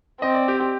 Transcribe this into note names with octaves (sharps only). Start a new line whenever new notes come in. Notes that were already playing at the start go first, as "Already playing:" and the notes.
C4 D#5
D5
G4
G4